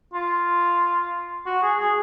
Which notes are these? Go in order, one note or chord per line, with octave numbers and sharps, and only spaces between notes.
F4
F#4
G#4
G#4